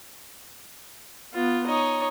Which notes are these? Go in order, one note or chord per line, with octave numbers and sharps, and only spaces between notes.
B3 F4
D#4 C#5 D#5